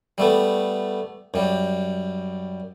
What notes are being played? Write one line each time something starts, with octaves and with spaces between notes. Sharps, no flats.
G3 A3 B3
F#2 G3